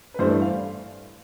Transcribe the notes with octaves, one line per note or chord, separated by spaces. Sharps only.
B4
G2 E3 A3 C5
D5
F5